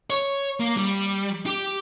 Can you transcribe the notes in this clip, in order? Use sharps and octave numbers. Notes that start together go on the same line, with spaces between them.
C#5
A#3
G3
G4